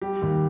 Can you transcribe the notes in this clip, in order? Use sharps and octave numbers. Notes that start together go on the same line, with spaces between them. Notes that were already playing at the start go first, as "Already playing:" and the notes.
G3 G4
D#2